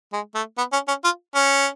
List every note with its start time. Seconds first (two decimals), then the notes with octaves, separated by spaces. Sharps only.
0.13 G#3
0.35 A3
0.58 B3
0.73 C#4
0.88 C#4
1.04 F4
1.34 C#4